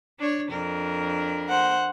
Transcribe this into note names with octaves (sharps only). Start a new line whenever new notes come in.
D4 C#5
F2 D4 A#4
C5 F#5